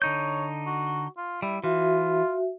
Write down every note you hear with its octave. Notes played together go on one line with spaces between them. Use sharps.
D3 D#4 C#5 G6
F#4
F4
G3 E4
E3 F4 F#4 E5